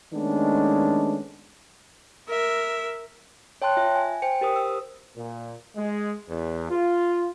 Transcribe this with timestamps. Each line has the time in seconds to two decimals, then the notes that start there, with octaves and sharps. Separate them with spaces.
0.13 D#3 G#3 A3 B3 C#4 D4
2.29 A#4 E5
3.62 C#5 G5 A5 C6 F#6
3.77 F4 E5
3.95 G#5
4.22 C5 G5 C#7
4.41 G4 A#4 C5 D#6
4.56 E6
5.16 A#2
5.76 G#3
6.29 E2
6.71 F4